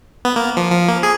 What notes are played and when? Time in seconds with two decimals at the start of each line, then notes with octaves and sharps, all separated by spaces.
0.25 B3
0.36 A#3
0.57 F3
0.71 F3
0.88 A#3
1.03 G#4